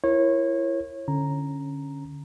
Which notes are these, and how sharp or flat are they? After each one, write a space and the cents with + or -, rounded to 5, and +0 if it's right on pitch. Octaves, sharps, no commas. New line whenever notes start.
E4 +25 A#4 +0 C#5 -30
D3 -5 C#4 -10 A#5 +0